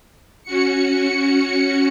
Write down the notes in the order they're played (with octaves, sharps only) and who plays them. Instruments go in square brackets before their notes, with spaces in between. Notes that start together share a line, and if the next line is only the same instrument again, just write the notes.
[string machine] C#4 F#4 C#7